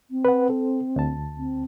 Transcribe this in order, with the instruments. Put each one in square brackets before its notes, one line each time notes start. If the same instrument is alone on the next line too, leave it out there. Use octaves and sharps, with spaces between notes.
[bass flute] C4
[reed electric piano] B4 F#5
A4
D2 A5
[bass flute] C4